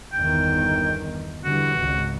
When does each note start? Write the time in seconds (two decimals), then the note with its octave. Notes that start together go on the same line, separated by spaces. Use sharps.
0.13 G1 E2 D#3 G5
1.45 D3 E3 G3 F#4
1.75 G#1 C#2 C#3